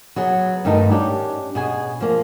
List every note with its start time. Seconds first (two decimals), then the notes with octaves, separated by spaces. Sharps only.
0.16 F#3 B3 G#4
0.65 G2 D#3 A3 D#4
0.90 C#4 D4 G4
1.55 B2 G#4 G#5
2.01 F3 A#3